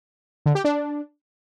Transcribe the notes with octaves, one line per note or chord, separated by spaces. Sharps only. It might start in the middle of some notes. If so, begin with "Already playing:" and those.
D3
G4
D4